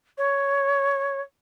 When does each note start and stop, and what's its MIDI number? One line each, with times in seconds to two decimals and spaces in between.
0.18 1.21 73